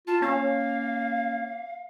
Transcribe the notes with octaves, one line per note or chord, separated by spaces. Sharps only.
F4 A5
A#3 C#4 F5